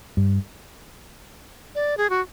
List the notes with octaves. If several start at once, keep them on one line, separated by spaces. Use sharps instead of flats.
G2
D5
G#4
F#4